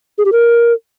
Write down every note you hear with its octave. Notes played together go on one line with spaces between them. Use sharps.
G#4
G4
A#4